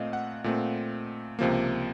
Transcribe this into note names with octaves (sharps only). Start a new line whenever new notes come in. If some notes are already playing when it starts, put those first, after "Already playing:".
Already playing: A#2 A3 C4 D#5 F5
F#5
A#2 A3 C4
C#2 C3 F3 A#3